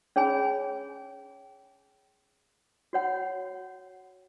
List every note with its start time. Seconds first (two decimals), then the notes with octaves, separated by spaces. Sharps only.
0.16 C#4 G#4 C#5 G#5 B5
2.93 F#4 C#5 F#5 B5